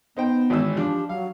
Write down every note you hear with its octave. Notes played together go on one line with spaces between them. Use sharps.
B3 D#4 C5 G5
G#1 E3 E6
F3 D4 G4
F#3 F5